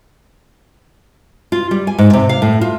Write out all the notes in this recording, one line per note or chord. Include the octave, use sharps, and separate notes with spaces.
F4
G3
G#5
G#2
C3
F5
A2
F4